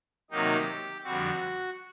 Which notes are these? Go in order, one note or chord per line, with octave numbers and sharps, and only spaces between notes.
C3 D#3 F#3 A#3 D#4 G4
F2 D3 G3 C4 F#4